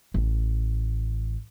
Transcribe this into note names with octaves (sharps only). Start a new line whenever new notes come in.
A1